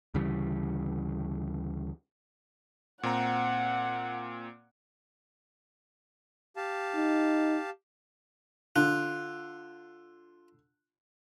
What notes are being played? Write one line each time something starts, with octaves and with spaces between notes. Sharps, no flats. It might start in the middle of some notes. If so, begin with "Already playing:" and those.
D2 C#3 E3 G3
A#2 C4 F#5 A#5
G4 F5 A5
D#4
D3 F4 F#6